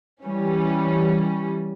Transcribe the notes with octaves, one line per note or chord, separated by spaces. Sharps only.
E3 G3 C#4